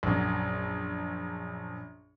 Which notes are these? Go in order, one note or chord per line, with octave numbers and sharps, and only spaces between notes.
A#1 F#2